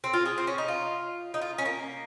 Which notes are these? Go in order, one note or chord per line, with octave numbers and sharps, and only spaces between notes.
C4
F4
G#4
C4
C#4
D#4
F4
D#4
F4
C#4
A#3